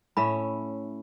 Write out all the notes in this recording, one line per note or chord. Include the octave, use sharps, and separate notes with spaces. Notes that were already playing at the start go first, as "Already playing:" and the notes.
A2 C#4 E5 B5